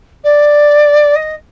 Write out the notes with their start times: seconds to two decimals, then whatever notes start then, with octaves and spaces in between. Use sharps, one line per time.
0.24 D5
1.15 D#5